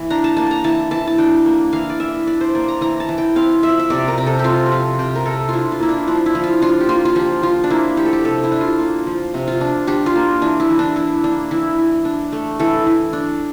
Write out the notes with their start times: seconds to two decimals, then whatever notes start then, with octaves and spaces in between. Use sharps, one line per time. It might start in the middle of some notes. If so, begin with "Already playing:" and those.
Already playing: E3 A#3
0.10 D4 A#5
0.24 A5
0.37 A#3 A5
0.51 A#5
0.64 E3 A5
0.91 E3 A5
1.07 A5
1.18 D4 G5
1.46 A#3
1.73 E3 F5
1.90 D5
2.00 E3 E5
2.27 D4 D5
2.41 C5
2.55 A#3 D5
2.68 A#5
2.81 E3 A#5
3.00 A5
3.09 E3
3.18 G5
3.36 C4 F5
3.63 F3 E5
3.79 E5
3.90 C3 D5
4.08 A#4
4.18 C3
4.26 A4
4.39 G4
4.44 C4 F4
4.66 G4
4.72 F3 F4
4.99 C3 G4
5.15 A#4
5.26 C3 A4
5.49 D4 E4 F4
5.72 F4
5.80 A#3 E4
5.89 D4
6.07 F3 D4
6.26 E4
6.35 F3
6.44 F4
6.62 D4 F4
6.81 G4
6.89 A#3 F4
7.05 F4
7.16 F3 G4
7.43 F3 F4
7.64 D4
7.70 A#3 E4
7.97 F3 G4
8.06 A4
8.13 G4
8.24 C3 A4
8.43 E4
8.52 D4
8.61 F4
8.79 A#3 F4
9.07 F3
9.34 C3
9.48 F4
9.61 D4
9.87 D4 G4
10.06 F4
10.15 A#3
10.41 E3 D4
10.60 E4
10.70 E3
10.79 D4
10.96 D4 E4
11.23 A#3 D4
11.51 E3 E4
11.78 E3
12.05 D4
12.32 A3
12.59 E3 A4
12.86 E3
13.13 D4